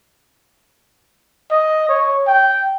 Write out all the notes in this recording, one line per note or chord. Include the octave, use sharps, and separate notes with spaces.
D#5
C#5
G5